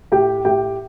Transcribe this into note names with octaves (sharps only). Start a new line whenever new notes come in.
A2 G4 G5
A2 G4 G5